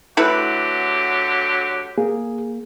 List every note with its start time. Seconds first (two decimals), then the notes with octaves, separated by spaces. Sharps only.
0.17 D3 F#3 A3 E4 G4 B4
1.98 A#3 G#4